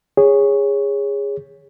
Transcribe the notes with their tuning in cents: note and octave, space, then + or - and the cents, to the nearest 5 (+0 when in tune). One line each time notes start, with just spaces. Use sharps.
G#4 -20 C#5 +0